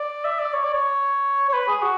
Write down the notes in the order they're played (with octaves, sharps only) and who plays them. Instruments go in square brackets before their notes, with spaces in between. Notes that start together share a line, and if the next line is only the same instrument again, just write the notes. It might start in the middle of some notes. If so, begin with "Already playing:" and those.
Already playing: [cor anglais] D5
E5
D5
C#5
D5
C#5
C#5
B4
G#4
F#4